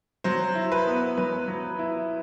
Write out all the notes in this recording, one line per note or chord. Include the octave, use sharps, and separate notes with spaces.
F#3 C5
E4
B4
B3
F#3 B4
F#3
E4